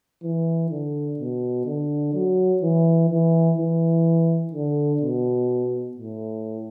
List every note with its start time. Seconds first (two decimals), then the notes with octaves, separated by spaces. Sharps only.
0.23 E3
0.70 D3
1.19 B2
1.66 D3
2.14 F#3
2.62 E3
3.10 E3
3.58 E3
4.53 D3
5.01 B2
5.97 A2